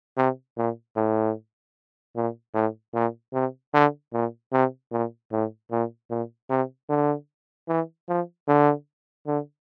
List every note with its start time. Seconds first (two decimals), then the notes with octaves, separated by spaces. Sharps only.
0.17 C3
0.58 A#2
0.96 A2
2.16 A#2
2.54 A2
2.94 A#2
3.34 C3
3.74 D3
4.13 A#2
4.53 C3
4.92 A#2
5.32 A2
5.71 A#2
6.11 A#2
6.50 C3
6.90 D3
7.68 E3
8.09 F3
8.48 D3
9.27 D3